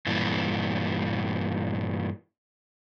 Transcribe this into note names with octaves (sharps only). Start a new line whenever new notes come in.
G2 A#2 E3